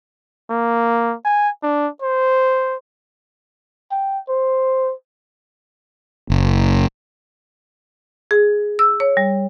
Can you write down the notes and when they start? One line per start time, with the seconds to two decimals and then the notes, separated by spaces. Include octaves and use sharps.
0.50 A#3
1.25 G#5
1.63 D4
2.02 C5
3.91 G5
4.29 C5
6.30 F#1
8.31 G#4
8.79 E6
9.00 C#5
9.17 G3